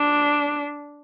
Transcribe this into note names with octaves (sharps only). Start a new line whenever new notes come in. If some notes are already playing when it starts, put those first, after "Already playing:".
Already playing: D4